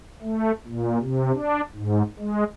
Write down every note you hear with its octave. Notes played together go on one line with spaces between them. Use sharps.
A3
A#2
C3
D4
G#2
G#3